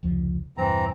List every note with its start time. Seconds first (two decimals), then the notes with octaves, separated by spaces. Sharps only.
0.03 F1 C#2 F3
0.57 E1 G2 E3 C4 A#5